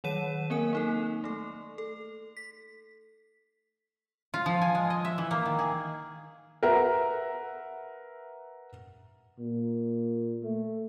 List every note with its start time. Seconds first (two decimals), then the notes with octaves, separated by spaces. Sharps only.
0.04 D#3 F#3 C#5 F#5 D#7
0.50 A#3 C4 A#4 G#5
0.73 A#3 D#4 A4
1.24 A3 A4
1.78 A4
2.37 B6
4.34 F4
4.46 F3
4.61 G#5
4.75 G#3
4.90 D#5
5.05 E5
5.18 E3
5.31 A#3
5.46 D#3
5.59 G#4
6.63 A#4 B4 E5 F#5 A#5
9.39 A#2
10.43 A3